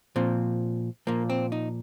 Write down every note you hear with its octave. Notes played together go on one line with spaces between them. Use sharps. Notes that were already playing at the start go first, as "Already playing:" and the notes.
A#2 F3 C4
A#2 F3 A#3
C4
D#4